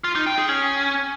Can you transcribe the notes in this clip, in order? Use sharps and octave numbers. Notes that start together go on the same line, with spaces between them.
F4
D#4
G5
G#4
C#4